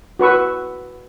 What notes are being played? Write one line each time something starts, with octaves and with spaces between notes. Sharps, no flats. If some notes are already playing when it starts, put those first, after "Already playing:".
F#4 B4 C#6 E6